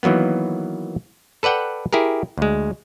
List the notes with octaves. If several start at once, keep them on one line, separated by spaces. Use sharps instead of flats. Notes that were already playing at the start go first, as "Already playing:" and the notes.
D#3 E3 F#3 A#3 B3
A4 B4 D5 F#5 G5
E4 G4 G#4 A#4
D2 G#3